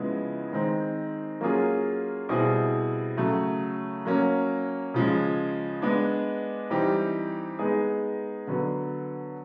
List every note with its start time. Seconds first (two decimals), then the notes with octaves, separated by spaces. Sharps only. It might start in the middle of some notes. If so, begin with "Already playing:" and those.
Already playing: C#3 F3 G#3 B3 E4
0.52 D#3 G#3 C4 D#4
1.40 F#3 A#3 C#4 F4 G#4
2.29 B2 G3 C4 E4 G#4
3.17 C#3 F#3 A3
4.05 F#3 A#3 C#4
4.94 C#3 F3 G#3
5.82 G#3 B3 D4
6.70 E3 G3 C4 D#4 G4
7.59 G#3 B3 D#4 G#4
8.47 D3 F#3 B3